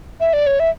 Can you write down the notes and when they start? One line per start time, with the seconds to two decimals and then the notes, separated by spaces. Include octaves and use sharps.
0.20 E5
0.33 D5
0.47 C#5
0.60 E5